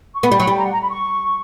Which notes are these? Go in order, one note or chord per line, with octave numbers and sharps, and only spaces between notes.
C#6
B3 B5
G3
F#3
G3
A#5
F#5
A#5
B5
C#6